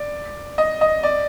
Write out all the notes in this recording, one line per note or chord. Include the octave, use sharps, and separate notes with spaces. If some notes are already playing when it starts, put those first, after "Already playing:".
Already playing: D5
D#5
D#5
D5